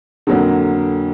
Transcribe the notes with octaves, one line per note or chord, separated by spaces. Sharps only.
F2 D3 F#3 A#3